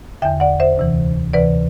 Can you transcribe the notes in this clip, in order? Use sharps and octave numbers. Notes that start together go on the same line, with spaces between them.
E2 D3 E5 G5
D5 F#5
C5 E5
D2 C3 E3
D2 C3 E3 B4 D5